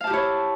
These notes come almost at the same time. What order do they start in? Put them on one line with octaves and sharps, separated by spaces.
F5 A5 G4 E4 C#5